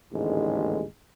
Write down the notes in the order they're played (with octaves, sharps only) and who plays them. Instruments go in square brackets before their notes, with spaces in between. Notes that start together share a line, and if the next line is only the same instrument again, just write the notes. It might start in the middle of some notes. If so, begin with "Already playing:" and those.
[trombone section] A1 D#2 G#2 D3 G#3